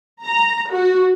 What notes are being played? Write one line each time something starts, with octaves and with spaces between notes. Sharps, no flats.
A#5
F#4